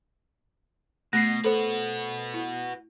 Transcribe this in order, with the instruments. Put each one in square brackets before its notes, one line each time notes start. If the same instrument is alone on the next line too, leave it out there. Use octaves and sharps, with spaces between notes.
[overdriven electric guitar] B2 [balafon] A3 [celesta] A#6 C7
[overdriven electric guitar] F#4 B4 [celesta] A4 C5
[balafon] E4